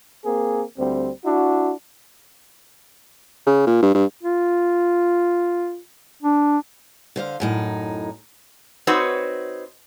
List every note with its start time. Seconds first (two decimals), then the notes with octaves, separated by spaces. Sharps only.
0.24 A#3 C4 G#4 A#4
0.78 D2 G3 C4
1.25 D4 E4 F#4
3.47 C#3
3.67 A#2
3.83 G2
3.95 G2
4.23 F4
6.23 D4
7.16 D3 C5 F5
7.40 F#2 A2 D#4
8.87 C4 D#4 F#4 B4 C#5